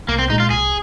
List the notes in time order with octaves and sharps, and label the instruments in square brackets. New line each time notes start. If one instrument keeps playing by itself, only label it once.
[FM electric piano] C2 [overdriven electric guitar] A#3
[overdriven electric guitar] C4
[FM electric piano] A#2 G#3 [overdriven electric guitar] D#4
[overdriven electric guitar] F4
[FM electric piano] C2 [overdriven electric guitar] G#4